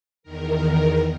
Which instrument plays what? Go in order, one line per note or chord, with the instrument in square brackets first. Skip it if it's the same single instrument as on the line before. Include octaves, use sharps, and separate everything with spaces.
[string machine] E2 D#3 A#4